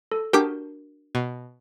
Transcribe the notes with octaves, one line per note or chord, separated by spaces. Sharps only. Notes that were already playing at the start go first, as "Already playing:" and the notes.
A4
D4 F#4 G4 A#4 G5 D6
B2